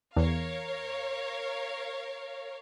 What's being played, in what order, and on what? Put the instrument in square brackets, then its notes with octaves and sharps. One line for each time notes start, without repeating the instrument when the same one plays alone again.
[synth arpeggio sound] E2 [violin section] A#4 C#5 F5